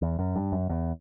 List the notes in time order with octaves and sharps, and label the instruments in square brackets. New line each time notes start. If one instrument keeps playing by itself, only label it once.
[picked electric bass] E2
F#2
G2
F#2
E2